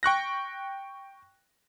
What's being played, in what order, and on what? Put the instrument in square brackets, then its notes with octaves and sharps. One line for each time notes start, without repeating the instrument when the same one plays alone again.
[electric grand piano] G5 C#6 F#6 A#6